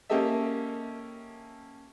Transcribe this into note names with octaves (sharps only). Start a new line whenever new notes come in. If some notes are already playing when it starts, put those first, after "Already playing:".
A#3 C#4 G4 A4 D#5 E5